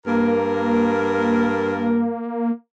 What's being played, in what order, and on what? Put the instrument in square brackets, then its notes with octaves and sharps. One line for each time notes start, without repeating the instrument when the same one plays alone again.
[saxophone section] G2 A#4 [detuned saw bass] A#3